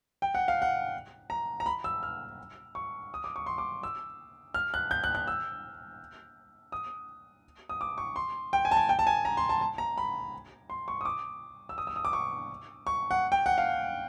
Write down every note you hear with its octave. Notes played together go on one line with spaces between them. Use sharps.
G5
F#5
F5
F#5
A#5
A#5
B5
E6
F6
C#6
D#6
D6
C#6
C6
D6
E6
F6
F#6
G6
F#6
F#6
E6
D#6
D#6
D6
C#6
C6
G5
G#5
A5
G#5
G5
A5
G#5
A#5
C6
A5
A5
A#5
B5
C6
C#6
D#6
D6
E6
D#6
E6
D#6
D6
C#6
C#6
F#5
G5
F#5
F5